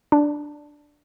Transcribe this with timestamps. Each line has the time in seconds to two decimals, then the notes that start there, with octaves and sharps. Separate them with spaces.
0.12 D4